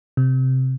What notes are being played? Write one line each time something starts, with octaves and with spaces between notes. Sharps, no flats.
C3